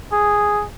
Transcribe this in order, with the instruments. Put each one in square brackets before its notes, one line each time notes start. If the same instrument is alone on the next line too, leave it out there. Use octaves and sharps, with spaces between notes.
[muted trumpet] G#4